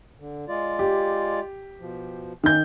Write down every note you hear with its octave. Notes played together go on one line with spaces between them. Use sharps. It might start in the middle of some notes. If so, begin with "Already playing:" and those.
D3
G#3 F4 D5
G4
B2 F3
D#3 A#3 C#4 G6